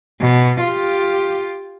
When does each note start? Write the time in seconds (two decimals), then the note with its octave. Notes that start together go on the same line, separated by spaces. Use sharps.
0.21 B2
0.61 F4 G4